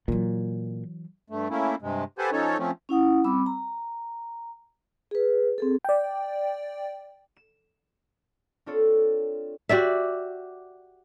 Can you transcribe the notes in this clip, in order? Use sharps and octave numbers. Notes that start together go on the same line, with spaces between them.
A#2 E3 F#3
G2 A3
A3 A#3 C#4 E4
G2 C3 G#3
G4 A4 B4 C5 F#5 G#5
F3 C#4 D#4 A4 C#5
F3 A3 C4 C#4
C#4 E4 F#5 D#6
G3 C4 B5 D6 E6
A#5
G#4 B4
C4 G#4 A4
D5 G5
E7
C4 D4 F4 A4 C#5
F#4 G4 D5 E5